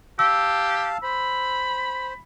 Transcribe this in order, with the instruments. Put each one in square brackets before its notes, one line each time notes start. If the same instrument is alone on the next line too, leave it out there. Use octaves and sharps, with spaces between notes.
[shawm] G4 [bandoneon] F5 A5 [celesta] E6
[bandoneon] C5 [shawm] B5